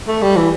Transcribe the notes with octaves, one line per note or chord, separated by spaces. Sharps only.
A3
G3
E3